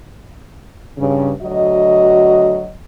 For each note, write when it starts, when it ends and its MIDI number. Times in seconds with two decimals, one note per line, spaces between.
0.98 1.31 43
0.98 1.31 49
1.41 2.70 38
1.41 2.70 54
1.41 2.70 66
1.41 2.70 75